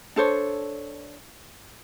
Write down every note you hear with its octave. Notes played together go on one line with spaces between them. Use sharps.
D4 A4 C5 C#5